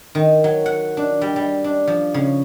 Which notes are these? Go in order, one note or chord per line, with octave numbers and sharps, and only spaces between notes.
D#3
F#3
F#5
D4
G3
G3
D4
F3
C#3